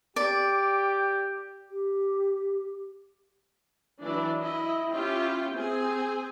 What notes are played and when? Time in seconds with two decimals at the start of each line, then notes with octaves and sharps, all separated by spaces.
0.16 G4 D5
1.71 G4
4.02 E3 F#3 D4 D5
4.41 E4 D#5
4.93 C#4 E4 F4 G4 E5 G5
5.55 C4 G#4 G#5